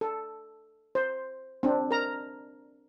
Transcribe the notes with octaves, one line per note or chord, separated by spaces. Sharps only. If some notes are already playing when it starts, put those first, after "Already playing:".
A4
C5
C4 D4
A#4 A#5